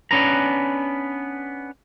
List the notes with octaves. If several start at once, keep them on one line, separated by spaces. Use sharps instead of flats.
B3 C#4 D4 B4 A#5